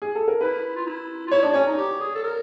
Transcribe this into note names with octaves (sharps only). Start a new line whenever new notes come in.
G#4
A4
A#4
E4 B4
F4
E4
F4
E4 C#5
D4 D5
C#4 C#5
D#4
G4
G#4
A4
A#4